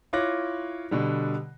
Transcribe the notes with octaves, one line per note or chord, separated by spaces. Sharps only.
E4 F4 C#5 D6 F#6 A#6
B2 D3 G3